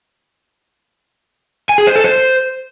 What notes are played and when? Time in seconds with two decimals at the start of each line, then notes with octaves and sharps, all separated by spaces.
1.69 G#5
1.78 G#4
1.87 C5
1.96 A4
2.04 C5